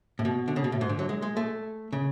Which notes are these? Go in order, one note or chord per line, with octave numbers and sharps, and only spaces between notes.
A2
B2
D3
C#3
B2
A2
G#2
D3
F#3
G#3
G#3
A3
C#3